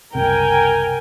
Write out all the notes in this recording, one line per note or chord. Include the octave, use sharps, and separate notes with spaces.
F#1 C2 C3 A#4 G5 G#5